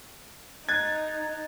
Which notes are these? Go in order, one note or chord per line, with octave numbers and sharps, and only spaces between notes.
D#4 F#6 G#6 A6